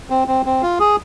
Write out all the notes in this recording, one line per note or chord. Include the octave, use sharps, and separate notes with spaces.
C4
C4
C4
F4
G#4